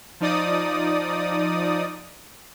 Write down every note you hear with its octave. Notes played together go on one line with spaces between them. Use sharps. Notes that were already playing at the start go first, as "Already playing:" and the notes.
F3 D#4 D5 D#6